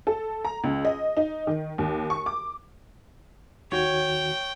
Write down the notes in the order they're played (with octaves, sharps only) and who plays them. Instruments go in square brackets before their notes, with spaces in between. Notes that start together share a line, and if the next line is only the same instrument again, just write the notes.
[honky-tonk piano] A4
A#5
C#2
D#5
D#4
D#3
D#2
C#6
D6
[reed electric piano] D#2 D#3 F#4 [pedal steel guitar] C#5 [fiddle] G5